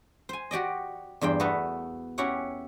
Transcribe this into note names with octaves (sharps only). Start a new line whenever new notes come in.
C5 G#5
F#4 G4 D5 D#5
E2 G2 C5 G5
A3 B3 F#4 A4 B4
C#4 E4 F#4 G4 C#5 F#5